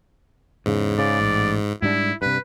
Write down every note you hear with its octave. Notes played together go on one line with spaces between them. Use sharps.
E2 G#2 C#3
C#3 D5
A1
G#2 G3 D4 E4
G2 C3 B4